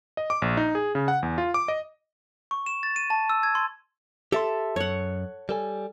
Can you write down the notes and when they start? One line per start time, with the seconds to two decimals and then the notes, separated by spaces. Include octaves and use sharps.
0.17 D#5
0.30 D6
0.42 A#1
0.57 D#4
0.75 G#4
0.95 C#3
1.08 F#5
1.23 E2
1.38 F4
1.54 D6
1.68 D#5
2.51 C#6
2.66 E7
2.83 A6
2.96 D#7
3.10 A5
3.30 E6
3.43 G#6
3.55 C6
4.32 G4 A4 E5 C6
4.76 F#2 C#5 F#5
5.49 G3 A4 G#5